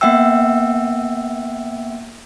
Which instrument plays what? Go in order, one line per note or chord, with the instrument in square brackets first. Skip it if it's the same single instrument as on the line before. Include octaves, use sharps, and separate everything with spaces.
[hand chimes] A#3 B3 E5 F#5 G5 E6